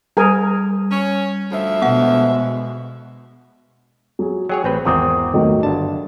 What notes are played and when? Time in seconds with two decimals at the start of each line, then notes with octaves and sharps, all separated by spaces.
0.17 G3 G#4 A#4 G#5
0.91 C#4 C#5
1.51 D2 F3 E5
1.82 B2 G#3 B3 F#5
4.19 F#3 G#4
4.49 F#3 G#4 C#5 G5
4.64 A1 C4 B4
4.85 G#1 E2 C4 A#5 D6 D#6
5.34 D#3 F#3 A3
5.63 G1 D4 A5